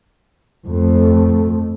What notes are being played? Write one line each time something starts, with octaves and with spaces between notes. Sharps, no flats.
F2 A3